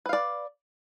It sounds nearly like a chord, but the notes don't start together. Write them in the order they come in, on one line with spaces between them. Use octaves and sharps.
B4 F5 D5